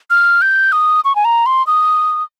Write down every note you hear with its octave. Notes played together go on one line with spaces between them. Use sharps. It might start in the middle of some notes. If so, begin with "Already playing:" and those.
F6
G6
D#6
C#6
G#5
A#5
C6
D#6